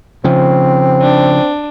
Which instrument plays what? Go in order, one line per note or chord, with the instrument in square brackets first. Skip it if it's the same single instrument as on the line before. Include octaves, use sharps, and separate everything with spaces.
[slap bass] C#3 F3 [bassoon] C4
[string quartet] D4